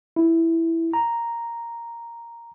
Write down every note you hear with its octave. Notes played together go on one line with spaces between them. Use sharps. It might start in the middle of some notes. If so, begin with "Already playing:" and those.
E4
A#5